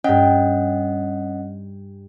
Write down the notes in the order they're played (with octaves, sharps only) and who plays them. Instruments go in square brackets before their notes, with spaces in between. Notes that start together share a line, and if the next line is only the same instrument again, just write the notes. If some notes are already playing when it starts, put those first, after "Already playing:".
[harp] G2 G5 [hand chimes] C#4 D#5 F#5